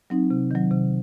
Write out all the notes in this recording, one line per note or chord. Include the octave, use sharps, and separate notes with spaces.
F#3 C4 D#4
C3
D#3 F#3
C3